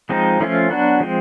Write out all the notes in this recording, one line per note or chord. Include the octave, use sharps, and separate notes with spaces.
F3 G#3 C4 D#4
F3 A3 C#4 F4
F#3 B3 D4 F#4
F3 G#3 C4